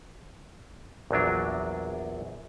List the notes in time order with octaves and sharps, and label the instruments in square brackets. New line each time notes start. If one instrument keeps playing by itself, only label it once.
[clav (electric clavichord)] A#1 E2 F#3 D4